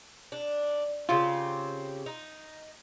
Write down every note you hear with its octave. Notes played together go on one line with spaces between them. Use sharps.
D4
C#3 C4 F4 G4
D#4